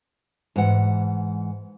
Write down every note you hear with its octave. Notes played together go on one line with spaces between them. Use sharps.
G#2 E3 F#5